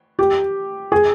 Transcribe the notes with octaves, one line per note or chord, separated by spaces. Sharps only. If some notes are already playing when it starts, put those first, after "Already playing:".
G4
G#4